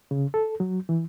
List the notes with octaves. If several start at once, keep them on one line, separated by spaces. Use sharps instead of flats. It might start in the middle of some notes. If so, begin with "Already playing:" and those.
C#3
A4
F#3
E3